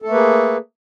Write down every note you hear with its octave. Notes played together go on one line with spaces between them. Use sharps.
A3 A#3 G#4 A4 B4